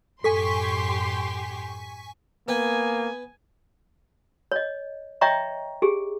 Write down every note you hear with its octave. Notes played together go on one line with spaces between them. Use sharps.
F#2 A2 G4 A4 G#5 C6 C#6 B6
A#3 B3 G#5
C#5 D#5
C#5 D#5 E5 G5 A#5 C#6
G4 G#4